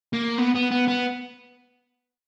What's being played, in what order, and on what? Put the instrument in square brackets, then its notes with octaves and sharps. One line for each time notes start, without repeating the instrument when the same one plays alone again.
[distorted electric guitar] A#3
B3
B3
B3
B3